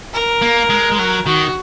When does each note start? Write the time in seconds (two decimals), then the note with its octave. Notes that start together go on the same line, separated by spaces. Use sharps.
0.14 A#4
0.42 A#3
0.70 G#3
0.92 G#3
0.98 F#3 A#4
1.26 D#3 F#4